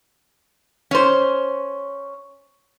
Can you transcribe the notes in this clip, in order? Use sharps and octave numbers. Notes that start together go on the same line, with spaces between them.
C#4 C5